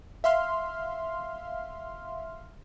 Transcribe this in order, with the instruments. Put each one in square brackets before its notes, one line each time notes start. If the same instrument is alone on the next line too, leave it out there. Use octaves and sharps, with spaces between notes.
[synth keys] E5 F5 C6 F6